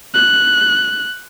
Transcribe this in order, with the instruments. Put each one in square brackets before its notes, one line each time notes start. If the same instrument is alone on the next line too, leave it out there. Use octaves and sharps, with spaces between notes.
[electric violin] F#6